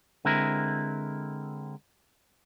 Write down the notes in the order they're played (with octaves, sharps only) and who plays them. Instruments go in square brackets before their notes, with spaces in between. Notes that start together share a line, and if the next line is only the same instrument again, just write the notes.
[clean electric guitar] D3 G#3 C4 E4 A#4